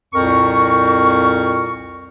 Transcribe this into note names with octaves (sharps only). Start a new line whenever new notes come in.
C2 F2 A#2 A#4 C#6